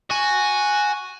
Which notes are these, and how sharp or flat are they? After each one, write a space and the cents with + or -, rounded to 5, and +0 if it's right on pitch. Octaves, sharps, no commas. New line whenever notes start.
F#4 +0 G#5 +0